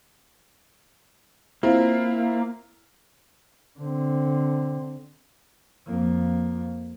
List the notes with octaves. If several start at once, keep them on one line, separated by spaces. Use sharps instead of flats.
A#3 C4 E4 F4
D3 C4
F2 A#3